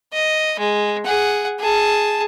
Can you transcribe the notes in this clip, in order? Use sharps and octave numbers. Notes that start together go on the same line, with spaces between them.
D#5
G#3
G#4 F#5
G#4 A5